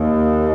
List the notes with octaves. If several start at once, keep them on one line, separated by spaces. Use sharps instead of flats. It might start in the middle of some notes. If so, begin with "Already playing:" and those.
Already playing: D#2